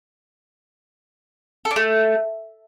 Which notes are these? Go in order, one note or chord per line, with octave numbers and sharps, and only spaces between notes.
A4
D4
A3